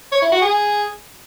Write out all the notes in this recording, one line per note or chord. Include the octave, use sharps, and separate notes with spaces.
C#5
E4
F#4
G#4